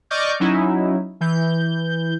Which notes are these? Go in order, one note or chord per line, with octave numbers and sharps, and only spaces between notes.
D5 D#5 C#6 D6 F6 G6
F#3 C#4 D#4 E4
E3 G6